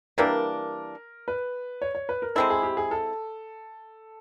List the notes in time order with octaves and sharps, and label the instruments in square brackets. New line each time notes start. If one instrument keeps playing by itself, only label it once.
[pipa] E3 G3 A#3 D4 [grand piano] A#4
[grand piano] B4
C#5
C#5
B4
A#4
[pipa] G#3 C4 E4 [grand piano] A4
[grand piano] G#4
G4
G#4
A4